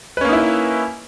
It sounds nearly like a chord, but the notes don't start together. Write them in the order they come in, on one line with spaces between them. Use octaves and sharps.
B4 C#4 A#3 D#4 E4